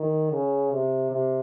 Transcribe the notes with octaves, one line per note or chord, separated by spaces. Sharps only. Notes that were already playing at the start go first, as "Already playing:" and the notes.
Already playing: D#3
C#3
C3
C3